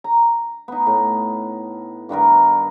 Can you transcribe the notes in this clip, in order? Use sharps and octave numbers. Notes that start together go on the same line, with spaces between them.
A#5
B3 D#4
A2
G2 D#3 B3 A#4